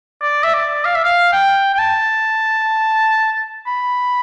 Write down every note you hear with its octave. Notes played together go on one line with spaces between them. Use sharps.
D5
E5
D5
F5
E5
F5
G5
G5
A5
B5